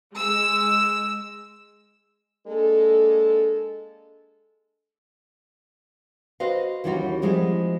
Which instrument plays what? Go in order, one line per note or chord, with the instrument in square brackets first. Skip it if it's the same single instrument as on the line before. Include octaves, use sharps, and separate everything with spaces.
[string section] G#3 E6
[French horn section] G#3 A#3 D4 A4
[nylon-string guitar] F#4 B4 C5 D#5 F5
D#2 E3 G3 C#4 F4 F#4
F3 G3 G#3 C4 E4 F#4